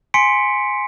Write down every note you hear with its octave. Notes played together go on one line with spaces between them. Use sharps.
G#5 C6 B6 C#7 D7